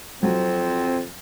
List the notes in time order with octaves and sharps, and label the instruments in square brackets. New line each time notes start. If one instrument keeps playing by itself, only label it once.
[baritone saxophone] F2 [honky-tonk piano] F#3 [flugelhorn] C4